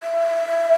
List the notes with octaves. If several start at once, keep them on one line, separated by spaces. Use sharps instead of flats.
E5